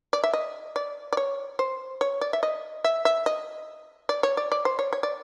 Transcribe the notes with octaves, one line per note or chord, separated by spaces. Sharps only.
D5
E5
D#5
D5
D5
C#5
C5
C#5
D5
E5
D#5
E5
E5
D#5
D5
C#5
D5
D5
C5
C#5
C#5
D5